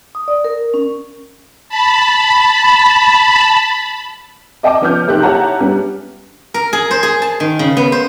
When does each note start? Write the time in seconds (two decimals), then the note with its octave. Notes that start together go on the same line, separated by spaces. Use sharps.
0.15 D#6
0.28 D5
0.44 A#4
0.74 C#4
1.69 A5 B5
4.63 D5 D#5 G5 A5 D6
4.82 F3 B3 C#4 D6 F6 G6
5.08 B1 A#3 G4 G#4 C5 F#6
5.22 E4 G4 C#5 F#5 A5 A#5
5.60 G3 B3 C#4 D4
6.54 A#4
6.73 G#4
6.91 C5
7.03 G#4
7.22 A5
7.40 D#3
7.59 C#3
7.77 B3
7.92 C5